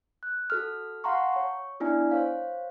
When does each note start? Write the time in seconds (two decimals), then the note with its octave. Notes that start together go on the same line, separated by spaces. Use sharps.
0.23 F#6
0.50 F#4 A4 F6
1.04 F5 F#5 A5 A#5 C6 C#6
1.33 C#5 C#6
1.80 B3 D4 E4 D5 G#5
2.11 C5 C#5 F5